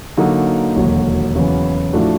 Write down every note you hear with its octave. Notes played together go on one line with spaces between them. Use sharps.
D3 F#3 A#3 D#4 F#4
E1 D#2 D3 F#3
E2 C#3 F#3 B3
A2 F3 A3 D4 F#4